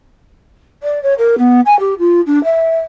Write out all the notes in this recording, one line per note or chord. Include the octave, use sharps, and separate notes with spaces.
D5
C#5
A#4
B3
G#5
G4
F4
D4
E5